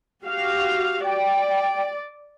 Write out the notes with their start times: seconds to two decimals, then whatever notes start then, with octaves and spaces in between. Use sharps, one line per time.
0.25 F#4 G4 F5
1.03 D5 G5